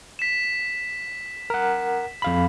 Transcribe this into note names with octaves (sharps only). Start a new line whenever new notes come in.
B6 E7
A#4 F#5
F2 F5 B5